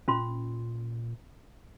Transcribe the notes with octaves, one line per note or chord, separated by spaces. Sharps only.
A#2 C#4 F4 C6